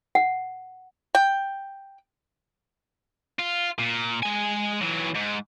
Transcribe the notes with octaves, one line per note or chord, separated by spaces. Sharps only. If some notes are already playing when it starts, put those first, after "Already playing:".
F#5
G5
F4
A#2
G#3 G#5
E3 F#3
G#2